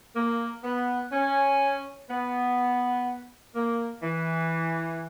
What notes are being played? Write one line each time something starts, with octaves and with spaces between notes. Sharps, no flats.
A#3
B3
C#4
B3
A#3
E3